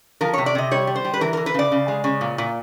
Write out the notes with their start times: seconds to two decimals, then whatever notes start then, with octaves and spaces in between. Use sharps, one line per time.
0.21 F3 A#4
0.33 C#5
0.38 C3
0.46 D5
0.55 C3 D#5
0.71 G3 C#5
0.87 G3
0.96 C5
1.05 G3
1.13 B4
1.21 E3 A#4
1.33 A#4
1.37 E3
1.46 B4
1.54 C#3 D5
1.72 C#3
1.88 G#3
2.04 C#3
2.21 A#2
2.38 A#2